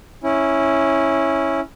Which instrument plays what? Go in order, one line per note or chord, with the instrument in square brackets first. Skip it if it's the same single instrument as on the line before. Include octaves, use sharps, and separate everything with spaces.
[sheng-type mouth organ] C#4 E4